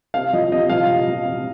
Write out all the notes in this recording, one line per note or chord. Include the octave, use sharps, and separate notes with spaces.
C3 F5
F3 D#5
C3 D#5
F3 F5
C3
F3
C3